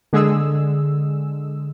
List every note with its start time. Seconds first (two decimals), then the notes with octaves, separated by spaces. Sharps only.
0.13 D3 G#3 G#4 E6